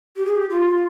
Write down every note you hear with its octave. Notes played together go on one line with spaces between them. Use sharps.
G4
G#4
G4
F4